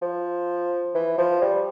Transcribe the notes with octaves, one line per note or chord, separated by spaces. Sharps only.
F3
E3
F3
G3